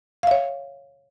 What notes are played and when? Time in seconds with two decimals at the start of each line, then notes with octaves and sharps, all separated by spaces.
0.23 F5
0.27 E5
0.31 C#5